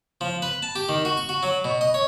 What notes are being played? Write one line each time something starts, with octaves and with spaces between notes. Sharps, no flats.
F3
B4
A5
G4
D#3
F#4
C#6
F#4
F#3
B2
D#5
C#5